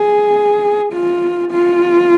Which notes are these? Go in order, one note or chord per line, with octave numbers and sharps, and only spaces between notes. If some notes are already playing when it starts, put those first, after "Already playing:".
Already playing: G#4
F4
F4